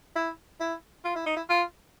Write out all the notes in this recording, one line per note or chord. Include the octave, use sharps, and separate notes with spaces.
E4
E4
F4
E4
D#4
E4
F4